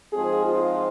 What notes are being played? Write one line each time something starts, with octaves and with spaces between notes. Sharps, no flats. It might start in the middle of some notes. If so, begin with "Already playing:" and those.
G#2 F3 G#3 C4 G#4
F4